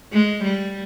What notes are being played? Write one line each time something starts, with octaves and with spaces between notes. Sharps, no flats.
G#3
G3